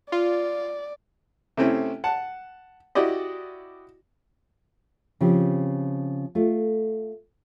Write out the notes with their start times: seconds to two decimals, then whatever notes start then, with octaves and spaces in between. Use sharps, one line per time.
0.12 F4 D5
1.57 C3 A3 C4 C#4 E4
2.04 F#5 A5
2.95 E4 F#4 G4 D5 D#5
5.21 C#3 F3 C4 G4
6.35 A3 F4